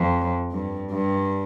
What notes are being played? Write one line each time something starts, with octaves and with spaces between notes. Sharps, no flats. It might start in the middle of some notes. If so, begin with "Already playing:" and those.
Already playing: F2
G2
G2